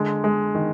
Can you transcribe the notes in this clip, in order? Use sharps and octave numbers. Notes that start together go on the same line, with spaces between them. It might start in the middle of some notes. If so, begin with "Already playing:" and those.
Already playing: D3 G#3
G#3
D#3